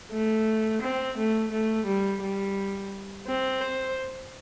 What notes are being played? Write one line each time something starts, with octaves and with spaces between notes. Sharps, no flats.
A3
C4
A3
A3
G3
G3
C4
C5